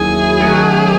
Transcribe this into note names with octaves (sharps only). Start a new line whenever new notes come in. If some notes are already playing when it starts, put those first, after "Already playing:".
Already playing: D#2 D#3 F#3 C#4 E4 G#4
D#3 F#3 A3 C#4